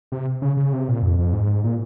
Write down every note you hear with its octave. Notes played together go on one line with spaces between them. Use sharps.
C3
C#3
C#3
C3
A#2
F2
F2
G#2
A#2